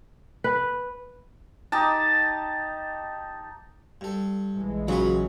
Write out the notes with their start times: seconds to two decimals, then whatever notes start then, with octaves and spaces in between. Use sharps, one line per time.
0.44 B4
1.72 D#4 G4 D#5 A5
4.01 G2 A4
4.55 A#1 E3 G#3
4.88 C#3 F#3 F4 F#4 B4